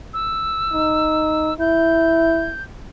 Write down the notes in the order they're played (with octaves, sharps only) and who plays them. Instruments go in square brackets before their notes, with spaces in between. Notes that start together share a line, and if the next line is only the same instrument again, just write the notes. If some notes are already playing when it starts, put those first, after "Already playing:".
[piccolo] E6
[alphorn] D#4
[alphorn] E4 [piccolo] G6